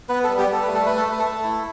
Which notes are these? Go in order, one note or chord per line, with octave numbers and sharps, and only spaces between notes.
B3 B4
G3 A4
G4
G3 A4
A3 B4
A4
A3 B4
A4
A3 B4
A4
A3
E4